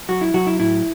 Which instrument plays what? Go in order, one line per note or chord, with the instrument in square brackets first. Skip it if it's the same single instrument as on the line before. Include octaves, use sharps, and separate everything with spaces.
[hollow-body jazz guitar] F#3 F#4
E4
F#3 F#4
E4
A2 E4